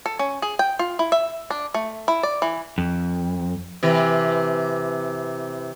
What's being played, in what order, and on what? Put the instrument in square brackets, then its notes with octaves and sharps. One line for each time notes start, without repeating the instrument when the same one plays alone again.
[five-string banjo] A4
C#4
G#4
G5
F4
E4
E5
D4
A3
E4
D5
E3
[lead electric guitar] F2
[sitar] C3 E3